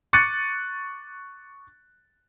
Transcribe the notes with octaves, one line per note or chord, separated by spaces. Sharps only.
C#6 D6 F#6 A6 C#7 D#7